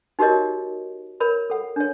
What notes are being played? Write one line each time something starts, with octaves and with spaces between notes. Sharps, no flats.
D#4 F#4 G4 A#4 C#5 D#5
A#4 C#5 B5
A4 F#5
D4 C#5